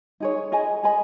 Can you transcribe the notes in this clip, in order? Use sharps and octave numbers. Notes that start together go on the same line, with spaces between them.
D#4 G#4 C#5
G#4 D#5 G#5 B5
G#4 D#5 G#5 B5